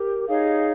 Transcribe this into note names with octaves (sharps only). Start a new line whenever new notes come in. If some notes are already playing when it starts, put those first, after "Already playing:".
Already playing: G4 A#4
D#4 G#4 C#5 F5